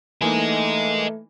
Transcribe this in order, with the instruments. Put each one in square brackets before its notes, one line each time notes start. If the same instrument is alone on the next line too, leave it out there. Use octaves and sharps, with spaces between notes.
[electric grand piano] E3 A#3 D#4 [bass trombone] A3 [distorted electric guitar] D#5 G#5